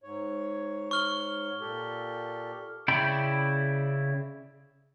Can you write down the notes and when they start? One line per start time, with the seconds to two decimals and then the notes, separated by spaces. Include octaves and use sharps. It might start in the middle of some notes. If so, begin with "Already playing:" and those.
0.03 G#2 C#5
0.91 C#6 F6 G7
1.61 A#2 G4 A4
2.88 C#3 E4 D5 G5 B5